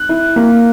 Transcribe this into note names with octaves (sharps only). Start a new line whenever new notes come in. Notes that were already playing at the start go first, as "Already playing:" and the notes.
Already playing: F#6
E4
A#3